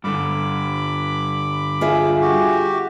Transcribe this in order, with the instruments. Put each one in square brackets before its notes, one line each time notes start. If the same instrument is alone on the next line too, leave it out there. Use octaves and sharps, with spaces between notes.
[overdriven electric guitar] G2 D3 [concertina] B5 D6
[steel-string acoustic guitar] F4 G#4 E5
[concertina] F#4 G4